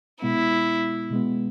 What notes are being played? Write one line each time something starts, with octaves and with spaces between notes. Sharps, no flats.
B2 G#3 B3 E4
B2 G#3 B3